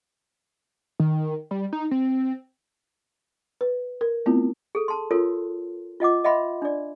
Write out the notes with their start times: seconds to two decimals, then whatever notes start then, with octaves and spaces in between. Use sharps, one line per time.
1.00 D#3
1.51 G3
1.73 D#4
1.91 C4
3.61 B4
4.01 A#4
4.26 A3 B3 C4 E4 F4
4.75 G#4 A4
4.88 A5 C6
5.11 F4 F#4 A4 A#4 C#5
6.00 F4 D#5 F#5 D6
6.24 D#5 E5 F#5 B5 C6
6.62 D4 D5